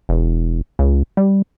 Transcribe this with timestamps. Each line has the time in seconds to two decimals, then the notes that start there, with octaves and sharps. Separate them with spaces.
0.09 E1
0.79 C#2
1.17 G3